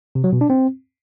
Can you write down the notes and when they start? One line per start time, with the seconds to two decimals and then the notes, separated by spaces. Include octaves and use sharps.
0.15 C3
0.24 F#3
0.33 B2
0.41 D4
0.50 C4